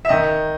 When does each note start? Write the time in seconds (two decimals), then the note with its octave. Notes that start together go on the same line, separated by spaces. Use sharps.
0.05 E5
0.09 D#3 D#5